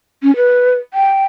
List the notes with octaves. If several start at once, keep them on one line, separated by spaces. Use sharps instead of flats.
C#4
B4
G5